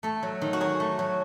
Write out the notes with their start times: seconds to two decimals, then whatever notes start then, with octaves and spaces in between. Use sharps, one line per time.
0.03 A3 A4
0.23 F#3
0.41 D#3
0.53 F#4
0.61 F#3 G#4
0.80 A3
0.99 F#3